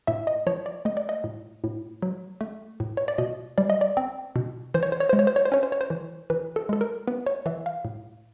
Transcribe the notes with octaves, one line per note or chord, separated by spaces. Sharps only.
A2 E5
D#5
F3 C#5
D5
A3 D#5
D5
D#5
A2
A2
F#3
A3
A2
C#5
D5
B2 D#5
G3 D5
D#5
D5
C4
B2
E3 C5
C#5
C5
C#5
G#3 C5
C#5
C5
C#5
C5
C#4 C#5
C5
C#5
C5
E3
E3 B4
A4
G#3 A4
A#4
B3 B4
C#5
E3 E5
F5
A2